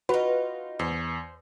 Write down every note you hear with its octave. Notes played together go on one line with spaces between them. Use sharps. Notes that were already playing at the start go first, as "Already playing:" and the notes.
D#4 F4 F#4 B4
E2 C5